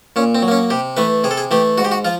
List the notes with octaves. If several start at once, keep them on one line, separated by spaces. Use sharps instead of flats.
A#2 C#4
C4
F#3
A#3 C#4
C3 G4
E3 A3 B4
C3 G#4
A4
G#4
E3 A3 G4
G#2 F#4
G4
F#4
F3 F4